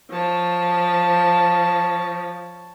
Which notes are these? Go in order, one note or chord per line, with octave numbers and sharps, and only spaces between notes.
F3 C#5 A5